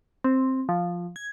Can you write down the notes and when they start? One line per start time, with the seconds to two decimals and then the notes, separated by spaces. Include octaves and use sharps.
0.24 C4
0.69 F3
1.16 G#6